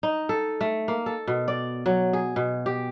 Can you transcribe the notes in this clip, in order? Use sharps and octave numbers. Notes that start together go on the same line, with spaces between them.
D#4
A4
A3
A#3
A4
B2
D5
F#3
G#4
B2
G4